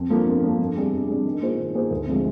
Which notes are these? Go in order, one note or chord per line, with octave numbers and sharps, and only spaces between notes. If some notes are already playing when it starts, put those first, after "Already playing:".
Already playing: F2
D3 F3 A#3
F2
D3 F3 A#3
F2
C3 G3 D4 G#4
F2
C3 G3 D4 G#4
D#3
A#3 F4 G#4 C5
D#3
A#3 F4 G#4 C5
D2
C3 F3 G#3